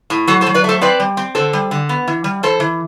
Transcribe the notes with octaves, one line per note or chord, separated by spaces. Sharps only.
A2
F#3 F#4 A4
A4 C5
F#3
B4 D5
A3 A4 C5
C4 B4 D5
G3
C4
D3 A4 C5
G3
D3
B3
E3
G3
E3 A4 C5
E3